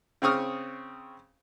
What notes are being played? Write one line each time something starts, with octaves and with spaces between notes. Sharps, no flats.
C#3 C4 C#6 D#6 F6